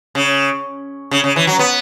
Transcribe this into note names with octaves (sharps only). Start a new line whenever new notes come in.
C#3
C#3
C#3
E3
F#3
B3